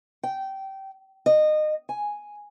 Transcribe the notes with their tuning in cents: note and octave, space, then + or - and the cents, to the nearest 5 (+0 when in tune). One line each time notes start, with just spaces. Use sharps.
G5 -20
D#5 -25
G#5 +0